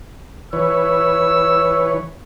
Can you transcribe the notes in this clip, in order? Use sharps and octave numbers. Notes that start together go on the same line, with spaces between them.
E3 B4 C#5 E6